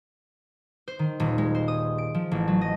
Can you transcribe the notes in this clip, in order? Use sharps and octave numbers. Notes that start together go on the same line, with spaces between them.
C5
D#3
D#1
G#3
C5
D#6
D7
F3
A1
F#3
D#5